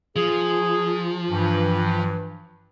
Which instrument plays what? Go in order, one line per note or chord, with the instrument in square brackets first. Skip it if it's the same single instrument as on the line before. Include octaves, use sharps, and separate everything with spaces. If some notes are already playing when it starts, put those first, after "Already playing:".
[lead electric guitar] F3 [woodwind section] G#4
[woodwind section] G2 E3